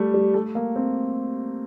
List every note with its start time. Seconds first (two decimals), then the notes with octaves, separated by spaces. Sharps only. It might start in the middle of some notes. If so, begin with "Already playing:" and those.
Already playing: G3 A3
0.14 G3
0.34 A3
0.55 A#3
0.76 C4